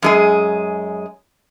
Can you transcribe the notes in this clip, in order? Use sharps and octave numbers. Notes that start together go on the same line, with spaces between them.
F#2 G#3 G#4